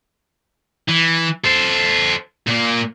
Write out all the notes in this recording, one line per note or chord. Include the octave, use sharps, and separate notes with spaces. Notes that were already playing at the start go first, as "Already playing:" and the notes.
E3
A4 C5
A#2 A#3